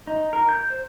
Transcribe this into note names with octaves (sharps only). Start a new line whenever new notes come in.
D#4
A#4
G6
C5